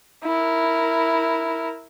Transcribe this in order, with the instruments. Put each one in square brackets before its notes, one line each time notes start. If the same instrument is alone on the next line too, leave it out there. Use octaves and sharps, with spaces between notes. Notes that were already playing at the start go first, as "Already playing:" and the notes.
[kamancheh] E4 A#4